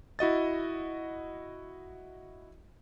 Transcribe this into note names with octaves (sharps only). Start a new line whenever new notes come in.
E4 F#4 D#5 A6